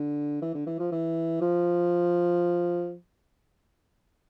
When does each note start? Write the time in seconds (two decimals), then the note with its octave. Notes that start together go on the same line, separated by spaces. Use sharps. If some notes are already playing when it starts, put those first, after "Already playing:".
Already playing: D3
0.42 E3
0.54 D3
0.66 E3
0.79 F3
0.92 E3
1.42 F3